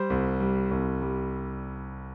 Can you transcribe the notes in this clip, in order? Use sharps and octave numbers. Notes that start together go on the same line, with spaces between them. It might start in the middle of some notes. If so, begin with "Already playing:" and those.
Already playing: G3 C5
C2
G3
C2
G3